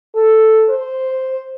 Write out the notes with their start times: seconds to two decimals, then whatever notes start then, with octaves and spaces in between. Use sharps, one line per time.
0.16 A4
0.69 C5